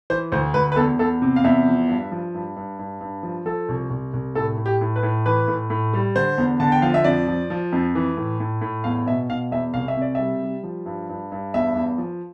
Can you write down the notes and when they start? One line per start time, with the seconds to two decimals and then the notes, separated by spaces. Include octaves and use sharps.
0.10 E3 C5
0.32 D2 C5
0.54 D2 B4
0.72 B4
0.76 E2 A4
0.99 E2 A4
1.22 C3
1.36 F5
1.44 E2 E5
1.66 F3
1.88 G2
2.12 F3
2.34 G2
2.56 G2
2.79 G2
3.01 G2
3.23 F3
3.46 F3 A4
3.69 C2
3.90 C2
4.14 C2
4.35 A2 A4
4.58 A2
4.66 G4
4.81 A2
4.96 B4
5.03 A2
5.26 E3 B4
5.48 A2
5.70 A2
5.93 G3
6.16 D3 C5
6.38 E2
6.60 D3 A5
6.72 G5
6.82 F3 F5
6.94 E5
7.04 F2 D5
7.27 F3
7.50 F3
7.72 F2
7.95 E3
8.17 A2
8.40 A2
8.61 A2
8.84 E2 F5
9.06 B2 E5
9.29 B2 F5
9.51 E2 E5
9.74 C2 F5
9.88 E5
9.97 C3 D5
10.15 G3 E5
10.42 G3
10.64 F3
10.86 G2
11.09 G2
11.32 G2
11.54 E2 E5
11.76 E2
11.98 F3